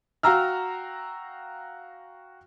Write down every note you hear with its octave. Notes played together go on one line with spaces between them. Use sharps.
F#4 F5 G5 A#5 E6 F6